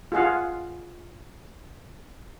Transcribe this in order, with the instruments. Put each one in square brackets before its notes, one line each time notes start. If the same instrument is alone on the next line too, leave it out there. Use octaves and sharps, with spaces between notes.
[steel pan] F4 G#4 F5 F#5